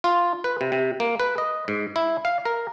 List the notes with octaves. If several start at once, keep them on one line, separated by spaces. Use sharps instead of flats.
F4
B4
C3
C3
A#3
B4
D#5
G#2
E4
F5
A#4